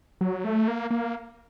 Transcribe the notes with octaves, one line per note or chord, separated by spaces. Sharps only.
F#3
A3
A#3
A#3